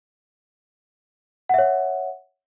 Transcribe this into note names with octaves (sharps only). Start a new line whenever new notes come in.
C#5 E5 F#5